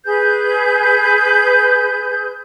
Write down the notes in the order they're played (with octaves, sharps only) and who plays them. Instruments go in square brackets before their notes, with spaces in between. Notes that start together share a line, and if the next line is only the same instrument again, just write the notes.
[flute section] G#4 B4 G6